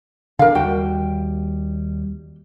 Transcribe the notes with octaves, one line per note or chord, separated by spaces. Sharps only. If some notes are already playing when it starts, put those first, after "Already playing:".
D3 A#4 F5
D#2 G3 F#4 G5